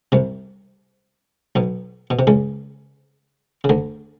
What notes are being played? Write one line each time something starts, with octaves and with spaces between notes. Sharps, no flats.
C2 C3
B1 B2
B2
C3
C#2 C#3
C#3
D2 D3